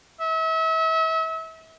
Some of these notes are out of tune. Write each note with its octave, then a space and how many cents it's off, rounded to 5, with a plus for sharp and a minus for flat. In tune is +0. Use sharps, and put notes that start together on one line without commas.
E5 -35